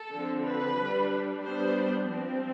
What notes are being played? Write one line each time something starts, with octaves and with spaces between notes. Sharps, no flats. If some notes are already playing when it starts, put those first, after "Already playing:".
Already playing: A4
D3 F3 C4
B4
G3 D4
G3 B3 D4 C5
F3 C4